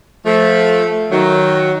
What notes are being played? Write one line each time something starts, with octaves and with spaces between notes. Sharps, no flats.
F3 A3
D#3 F#3